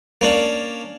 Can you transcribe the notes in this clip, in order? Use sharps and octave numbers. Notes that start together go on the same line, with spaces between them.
A#3 C#4 D4